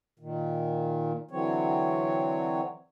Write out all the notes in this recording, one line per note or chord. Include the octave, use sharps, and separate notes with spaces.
A#2 D#3
D3 E3 F#3 C4 C#5